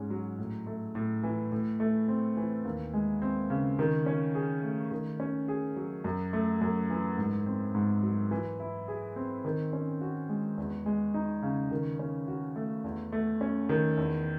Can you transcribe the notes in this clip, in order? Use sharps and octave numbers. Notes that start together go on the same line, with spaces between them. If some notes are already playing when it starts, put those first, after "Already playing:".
Already playing: G#2 C#4 G#4
F#3
A2
A3
A2
E3
A2
A3
C4
E3
D#2
G#3
C4
C#3
D#3
C#4
G#4
A3
D#3
C#4
G#4
F#3
F#2
A3
F#2
E3
G#2
C4
G#2
F#3
E3
E4
G#4
C4
D#3
C#4
F#4
G#3
E2
G#3
D#4
C#3
D#3
C#4
F#4
A3
E2
A3
C#4
D#3
E2